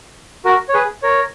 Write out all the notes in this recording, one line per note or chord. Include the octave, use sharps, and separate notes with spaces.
F#4 A#4
C#5
G#4 B4
A#4 C#5